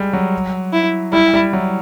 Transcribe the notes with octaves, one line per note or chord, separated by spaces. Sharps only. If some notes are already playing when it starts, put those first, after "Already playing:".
Already playing: G3 G#3
F#3
E4
G3 E4
G3
F#3